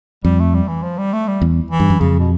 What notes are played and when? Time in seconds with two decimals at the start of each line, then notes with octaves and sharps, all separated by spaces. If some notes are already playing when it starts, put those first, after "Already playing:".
0.24 F2 G3
0.40 A3
0.54 G3
0.68 E3
0.83 F3
0.98 G3
1.13 A3
1.27 G3
1.42 E2
1.71 E3
1.80 G2
1.90 F#2
2.00 F2 C#3
2.20 B2